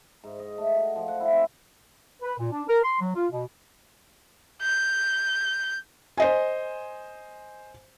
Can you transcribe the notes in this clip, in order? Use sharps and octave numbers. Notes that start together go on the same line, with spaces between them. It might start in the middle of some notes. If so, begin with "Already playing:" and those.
G#2
D#5
A3
F#4
F3
F#5
E4
C4
B4
A#2
D4
A#4
C6
F#3
F4
B2
G6
C5 D#5 G#5